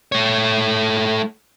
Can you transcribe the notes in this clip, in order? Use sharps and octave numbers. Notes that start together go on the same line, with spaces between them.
A3 C#5